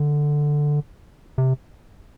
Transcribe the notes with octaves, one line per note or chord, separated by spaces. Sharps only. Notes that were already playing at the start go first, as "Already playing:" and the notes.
Already playing: D3
C3